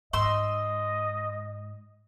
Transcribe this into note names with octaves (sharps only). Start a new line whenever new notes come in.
G#2 D#5 C6 E6